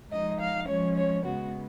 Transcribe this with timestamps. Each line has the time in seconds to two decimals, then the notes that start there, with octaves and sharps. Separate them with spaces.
0.11 F3 G#3 D#4 D#5
0.40 F5
0.68 F3 G#3 C#4 C#5
0.97 C#5
1.25 C#3 G#3 B3 F#4